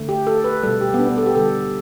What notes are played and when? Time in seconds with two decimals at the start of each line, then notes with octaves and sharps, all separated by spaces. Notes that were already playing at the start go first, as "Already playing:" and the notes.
Already playing: D3 A3
0.09 G4
0.27 A4
0.44 B4
0.63 B2 G3 A4
0.81 G4
0.94 B3
0.99 D4
1.09 B3
1.18 A4
1.26 G4
1.35 D3 G3 A4